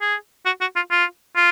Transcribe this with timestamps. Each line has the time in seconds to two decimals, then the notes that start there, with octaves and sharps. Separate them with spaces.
0.01 G#4
0.46 F#4
0.61 F#4
0.76 F4
0.91 F4
1.36 F4